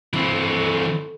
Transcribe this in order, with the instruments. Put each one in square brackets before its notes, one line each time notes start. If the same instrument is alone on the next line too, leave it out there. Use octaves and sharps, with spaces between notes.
[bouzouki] A2 [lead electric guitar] E3 C4